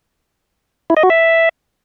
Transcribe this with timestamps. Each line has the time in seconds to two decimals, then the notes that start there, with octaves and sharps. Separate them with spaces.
0.90 E4
0.97 D#5
1.03 F#4
1.10 E5